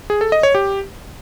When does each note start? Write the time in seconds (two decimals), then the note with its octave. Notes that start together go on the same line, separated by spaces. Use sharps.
0.10 G#4
0.21 A4
0.32 D#5
0.43 C#5
0.55 G4